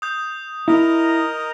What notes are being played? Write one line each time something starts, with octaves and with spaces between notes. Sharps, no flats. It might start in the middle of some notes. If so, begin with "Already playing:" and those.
D#6 G6
E4 A#4 D#5 A#5